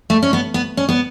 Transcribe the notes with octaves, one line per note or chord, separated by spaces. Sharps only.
A3
C#4
B3
B3
C#4
B3